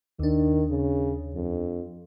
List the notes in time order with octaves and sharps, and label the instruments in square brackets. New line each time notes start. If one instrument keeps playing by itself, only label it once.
[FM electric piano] D#2 D4 [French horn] D#3
[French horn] C#3
F2